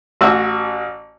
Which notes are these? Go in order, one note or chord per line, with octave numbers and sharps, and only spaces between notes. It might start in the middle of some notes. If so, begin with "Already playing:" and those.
A1 F#4 E6